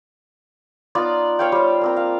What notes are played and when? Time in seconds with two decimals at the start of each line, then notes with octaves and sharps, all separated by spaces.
0.95 B3 D#4 F4 D5
1.39 C#5 F5 G5
1.52 G3 C5
1.81 A#3 C4 A#5
1.96 F5